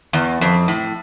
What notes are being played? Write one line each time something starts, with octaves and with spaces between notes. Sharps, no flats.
E2
F2
A2